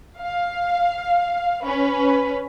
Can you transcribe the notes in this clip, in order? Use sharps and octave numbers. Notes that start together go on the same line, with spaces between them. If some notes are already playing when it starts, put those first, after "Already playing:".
F5
C#4 B4